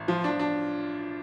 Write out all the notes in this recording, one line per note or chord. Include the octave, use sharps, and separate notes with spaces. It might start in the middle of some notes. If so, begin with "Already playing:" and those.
Already playing: A1
F3 F4
D4
F3
D4